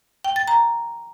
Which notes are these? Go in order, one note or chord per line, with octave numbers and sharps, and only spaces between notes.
G5
A6
A#5